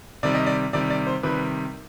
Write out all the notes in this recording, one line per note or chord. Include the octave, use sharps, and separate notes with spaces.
C3 D#3 G3 D5
D#5
D5
C3 D#3 G3 D5
D5
C5
C3 D#3 G3 B4